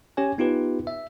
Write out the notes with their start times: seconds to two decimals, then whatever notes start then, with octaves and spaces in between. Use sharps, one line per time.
0.17 C#4 G4 C#5 G#5
0.38 B3 D#4 F4 G4 B4
0.87 E5